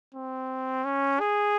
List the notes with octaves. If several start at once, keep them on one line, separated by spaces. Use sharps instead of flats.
C4
C#4
G#4